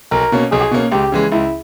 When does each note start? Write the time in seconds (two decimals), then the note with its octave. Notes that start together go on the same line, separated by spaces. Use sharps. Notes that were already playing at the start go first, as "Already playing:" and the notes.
0.11 B1 A#4
0.32 B2 A#3 C#4
0.52 B1 G#4
0.71 B2 A#3 C#4
0.92 C#2 G4
1.12 C#3 E3 G#3
1.32 C#2 E4